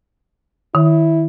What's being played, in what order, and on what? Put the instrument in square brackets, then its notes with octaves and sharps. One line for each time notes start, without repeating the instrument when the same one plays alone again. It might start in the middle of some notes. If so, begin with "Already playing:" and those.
[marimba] D#3 [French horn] E4